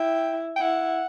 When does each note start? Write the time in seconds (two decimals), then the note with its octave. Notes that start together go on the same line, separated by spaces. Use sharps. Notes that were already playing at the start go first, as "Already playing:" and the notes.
Already playing: E4 G5
0.56 G5
0.60 E4 F#5